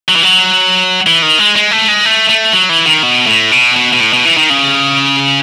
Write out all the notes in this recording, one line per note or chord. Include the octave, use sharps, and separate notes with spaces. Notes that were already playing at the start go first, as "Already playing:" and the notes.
F#3
E3
F#3
E3
D#3
G#3
G#3
A3
G#3
A3
A3
F#3
E3
D#3
B2
A2
B2
B2
B2
A2
B2
E3
D#3
C#3